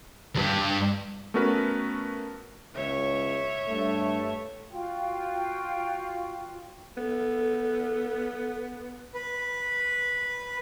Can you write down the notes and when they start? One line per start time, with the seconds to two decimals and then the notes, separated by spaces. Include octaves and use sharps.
0.35 D2 G2
1.34 A3 B3 C#4 F#4 A#4 B4
2.75 C#2 C#5 E5
3.68 G2 A3
4.70 F4 F#4 G5
6.97 B3 A4
9.14 B4